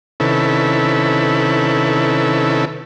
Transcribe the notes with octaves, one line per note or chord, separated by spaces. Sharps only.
C3 D#3 C#4 E4 A4 B4